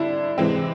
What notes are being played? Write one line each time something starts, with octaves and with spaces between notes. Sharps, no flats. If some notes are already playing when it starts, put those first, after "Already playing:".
Already playing: D3 G3 D4 E4
C3 E3 G#3 C4